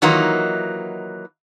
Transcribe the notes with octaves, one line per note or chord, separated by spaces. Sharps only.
D#3 E3 F#3 A#3 D#4 F4